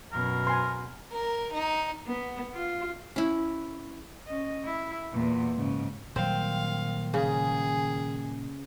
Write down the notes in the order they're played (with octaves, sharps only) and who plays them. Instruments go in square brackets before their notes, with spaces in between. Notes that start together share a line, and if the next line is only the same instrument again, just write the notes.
[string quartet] F#2 B2 [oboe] A#4
[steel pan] G#5 C6
[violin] A#4
D#4
[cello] B3
F4
[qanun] C#4 E4
[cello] C#4 D#5
E4
E2 A#2
G#2 C#3
[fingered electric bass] A#2 F#3 G3 [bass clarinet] D#3 [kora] C4 [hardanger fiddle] F5
[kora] C#3 [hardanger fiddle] G#4